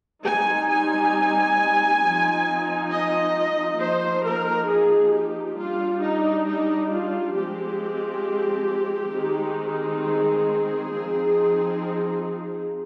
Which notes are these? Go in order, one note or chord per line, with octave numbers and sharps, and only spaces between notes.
G3 C4 D#4 G#5
G#5
F3 C4 D#4
D#5
F3 A#3 D#4 C5
A#4
G#4
G4
G3 D4 F4
D#4
D#4
F4
F3 G#3 C4 G4
D#3 G#3 C4 D#4
G#4
F3 C4 D#4